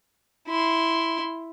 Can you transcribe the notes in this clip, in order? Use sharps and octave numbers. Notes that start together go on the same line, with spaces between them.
E4 C6